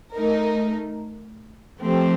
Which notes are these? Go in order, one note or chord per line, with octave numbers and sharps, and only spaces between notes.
A3 D#4 A#4
F3 A3 C4 G4